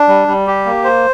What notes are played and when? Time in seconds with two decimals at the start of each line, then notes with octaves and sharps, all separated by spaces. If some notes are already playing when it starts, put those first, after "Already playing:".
Already playing: D4
0.08 G3
0.28 G3
0.47 G4
0.65 A#3
0.84 C5